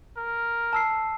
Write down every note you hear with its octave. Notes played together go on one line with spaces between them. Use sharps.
A#4
A5 E6 C7